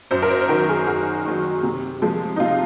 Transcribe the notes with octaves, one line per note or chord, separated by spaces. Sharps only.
F#2 C5
A#4
C5
C5
D#3 F#3 A#4
G#4
F#2 F#4
D#3 F#3
C3
F3 G#3
D#4
C3 F4